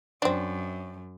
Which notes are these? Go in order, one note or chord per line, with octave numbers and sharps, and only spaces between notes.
F#2 C4 D4